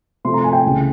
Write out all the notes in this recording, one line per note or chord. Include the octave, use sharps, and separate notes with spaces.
C3 F3 A3 C6
A#5
G#5
G5
C#2 C#3 E3 A3